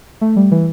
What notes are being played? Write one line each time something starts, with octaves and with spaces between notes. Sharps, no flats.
A3
G3
E3